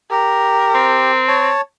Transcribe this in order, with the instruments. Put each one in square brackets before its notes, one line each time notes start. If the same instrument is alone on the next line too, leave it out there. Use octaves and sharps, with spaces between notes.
[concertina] G4 [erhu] A#4
[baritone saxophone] C4
[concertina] C#5 A5